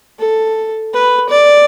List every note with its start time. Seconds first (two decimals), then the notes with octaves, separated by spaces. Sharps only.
0.20 A4
0.94 B4
1.29 D5